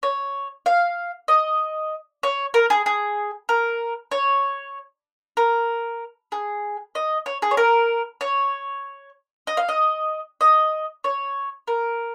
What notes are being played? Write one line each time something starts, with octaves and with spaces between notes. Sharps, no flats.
C#5
F5
D#5
C#5
A#4
G#4
G#4
A#4
C#5
A#4
G#4
D#5
C#5
G#4
C#5
A#4
C#5
D#5
F5
D#5
D#5
C#5
A#4